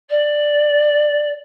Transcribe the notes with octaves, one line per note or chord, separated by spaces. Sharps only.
D5